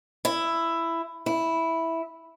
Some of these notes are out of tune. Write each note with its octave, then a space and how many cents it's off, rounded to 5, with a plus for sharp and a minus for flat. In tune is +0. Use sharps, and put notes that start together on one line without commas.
E4 +10
E4 -5